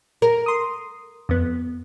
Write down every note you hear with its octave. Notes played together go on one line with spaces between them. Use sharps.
A#4
C6 D#6
F2 B3